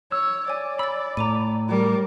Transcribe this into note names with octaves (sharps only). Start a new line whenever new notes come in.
C#5 E6
C#5 D5 G#5
B5 E6 A6
A2 A#5 D6 D#7
G3 A#4